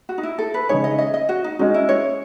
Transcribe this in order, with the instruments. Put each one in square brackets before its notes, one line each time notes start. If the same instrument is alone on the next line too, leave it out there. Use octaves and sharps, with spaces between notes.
[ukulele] F#4
D#4
E4
A4
B4
[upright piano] C#3 G#3 D#4 G#4 [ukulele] C#5
[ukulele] D#5
D#5
D#5
F#4
D#4
[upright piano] G#3 C#4 F#4 [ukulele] D#4
[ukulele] E4
C#5